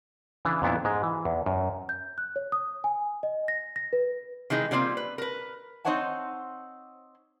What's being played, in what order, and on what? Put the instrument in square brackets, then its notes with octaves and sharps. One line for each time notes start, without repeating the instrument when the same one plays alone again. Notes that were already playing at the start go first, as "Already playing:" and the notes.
[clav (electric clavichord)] C#3 E3 D4 E4
F2 A#2 B3 D4 E4
G#2 G#3
E3
E2
F#2
[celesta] G6
F#6
C#5
D#6
G#5
D#5
A#6
A#6
B4
[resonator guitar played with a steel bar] D#3 E3 G#3 D#4
D3 G3 A#3 C4 F4
B4
A#4 B4
C4 D#4 C5 C#5 F#5 A5